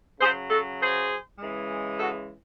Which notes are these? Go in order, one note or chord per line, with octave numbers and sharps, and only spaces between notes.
C#3 F#3 G#4 C5
F#4 A4
G#4 C5
C#3 E3 G#3
F#4 A4